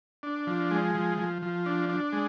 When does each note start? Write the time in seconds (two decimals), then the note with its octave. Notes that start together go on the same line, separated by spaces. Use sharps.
0.23 D4
0.47 F3
0.71 G#3
0.95 F3
1.18 F3
1.42 F3
1.66 D4
1.89 D4
2.13 G#3